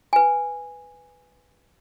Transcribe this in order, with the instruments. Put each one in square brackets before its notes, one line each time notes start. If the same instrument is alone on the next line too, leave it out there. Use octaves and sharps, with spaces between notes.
[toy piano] B4 G#5